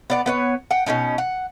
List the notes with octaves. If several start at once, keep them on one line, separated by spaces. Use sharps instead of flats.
B3 D5 F#5
B3 B4 C#5
F#5 G5
B2 B3 C#4 D#4
F#5